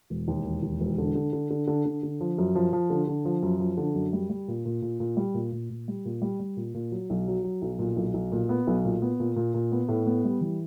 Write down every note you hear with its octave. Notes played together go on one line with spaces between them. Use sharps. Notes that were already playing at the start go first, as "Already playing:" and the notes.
E1
D#2
E1
D#2
E1
D3
D3
D3
D3
D3
D3
D3
F3
F#2
F3
F3
D3
D3
F3
F#2
F3
D3
F#2
G3
G3
A#2
A#2
A#2
A#2
G3
A#2
A#2
A#2
G3
A#2
G3
G3
A#2
A#2
F#3
B1
F#3
F#3
B1
A#2
B1
B1
A#2
B3
B1
A#2
B3
A#2
A#2
A#2
B3
A2
B3
G3
E3